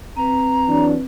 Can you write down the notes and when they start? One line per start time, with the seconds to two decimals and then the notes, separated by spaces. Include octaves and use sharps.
0.17 C4 B4 A#5
0.68 E3 F#3 D4